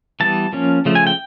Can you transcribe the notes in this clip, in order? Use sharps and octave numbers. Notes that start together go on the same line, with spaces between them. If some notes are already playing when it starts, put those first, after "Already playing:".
E3 G3 B3 A5
F3 A#3 C#4
C#3 F3 A3
G#5
G5